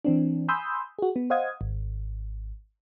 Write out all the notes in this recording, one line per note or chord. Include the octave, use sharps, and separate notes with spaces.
E3 C4 D4
G#5 B5 C6 D#6 E6 G6
F#4 G#4
B3
C5 D#5 F5 F#5 D#6 G#6
G#1